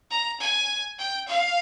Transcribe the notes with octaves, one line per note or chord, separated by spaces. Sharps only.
A#5
G#5
G5
F5